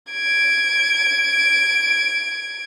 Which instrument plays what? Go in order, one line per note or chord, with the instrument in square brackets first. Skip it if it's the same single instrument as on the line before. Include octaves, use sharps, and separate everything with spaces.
[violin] G#6 D7